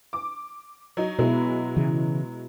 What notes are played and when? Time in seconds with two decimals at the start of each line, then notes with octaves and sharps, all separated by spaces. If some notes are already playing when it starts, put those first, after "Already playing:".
0.13 D6
0.97 F#3 D#4
1.19 B2 F#3 G#3 E4
1.76 C#3 E3